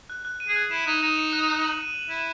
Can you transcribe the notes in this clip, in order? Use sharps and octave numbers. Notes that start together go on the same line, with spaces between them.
F#6
F#6
D#7
G#4
F#6
E4 E7
D#4 F#6
D#4 E7
C#7
F#6
F#6
F#7
D#7
F#7
E4 D#7